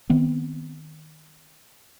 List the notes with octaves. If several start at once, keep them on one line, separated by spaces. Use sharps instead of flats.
D#3 B3 C4